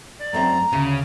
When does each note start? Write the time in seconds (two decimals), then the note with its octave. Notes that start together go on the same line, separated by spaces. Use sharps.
0.19 D5
0.33 F#2 A3 C4 A#5
0.73 D2 C#3 C#4